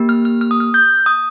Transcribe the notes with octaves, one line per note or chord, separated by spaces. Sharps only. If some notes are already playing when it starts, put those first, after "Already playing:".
Already playing: A#3 G4
F6
F6
F6
D#6
F6
G6
D#6